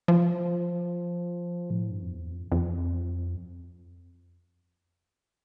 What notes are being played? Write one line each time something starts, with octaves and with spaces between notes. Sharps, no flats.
F3
A2
G2
F2
E2
F2
F2